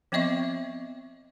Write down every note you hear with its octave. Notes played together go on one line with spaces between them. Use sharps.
F3 B3 C4 D#5 E5 C#6